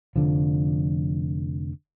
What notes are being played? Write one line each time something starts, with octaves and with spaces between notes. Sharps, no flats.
F1 D3 F3